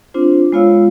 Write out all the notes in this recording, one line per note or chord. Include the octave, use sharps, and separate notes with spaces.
C4 D4 F4 C5
G#3 B3 F4 C#5 F5 E6